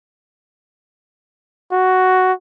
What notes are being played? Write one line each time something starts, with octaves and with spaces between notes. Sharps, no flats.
F#4